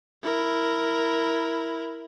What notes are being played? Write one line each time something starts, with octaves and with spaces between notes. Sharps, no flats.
E4 A#4